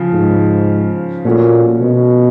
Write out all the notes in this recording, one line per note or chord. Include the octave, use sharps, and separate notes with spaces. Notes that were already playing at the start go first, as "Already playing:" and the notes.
Already playing: C#3 F3
G#2
A#2 A3 C#4 F#4
B2